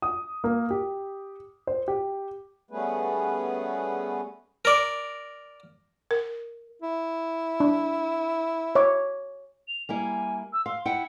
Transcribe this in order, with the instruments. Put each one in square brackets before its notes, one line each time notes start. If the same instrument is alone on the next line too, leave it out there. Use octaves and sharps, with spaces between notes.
[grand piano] D#6
A#3
G4
C5
G4
[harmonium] G3 A3 B3 C#4 G#4 B4
[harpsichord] A#4 D5
[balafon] A#4
[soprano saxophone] E4
[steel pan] D4
C#5 E5 D6
[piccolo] F7
[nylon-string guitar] G3 A#3 E4 [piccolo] G#5
[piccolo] E6
[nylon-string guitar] F5 [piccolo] C6
[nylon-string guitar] E4 F#5 G5 [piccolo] C#7